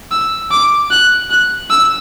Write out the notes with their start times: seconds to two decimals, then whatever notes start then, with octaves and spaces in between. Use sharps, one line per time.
0.11 E6
0.51 D6
0.91 F#6
1.30 F#6
1.70 E6